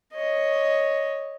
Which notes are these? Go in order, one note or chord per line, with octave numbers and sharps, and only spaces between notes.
C#5 D#5